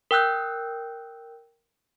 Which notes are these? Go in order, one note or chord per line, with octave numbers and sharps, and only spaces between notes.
A#4 G5 E6 F#6 G6